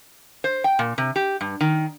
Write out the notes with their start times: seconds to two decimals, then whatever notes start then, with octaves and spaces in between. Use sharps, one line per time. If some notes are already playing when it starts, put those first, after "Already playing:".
0.44 C5
0.64 G5
0.79 A#2
0.98 C3
1.16 G4
1.41 G2
1.61 D#3